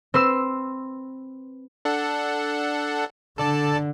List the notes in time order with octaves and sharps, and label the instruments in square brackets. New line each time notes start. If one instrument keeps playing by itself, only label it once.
[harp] C4 B4 C6 E6
[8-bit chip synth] D4 A4 F#5
[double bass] D3 [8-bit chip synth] A4 D5 A5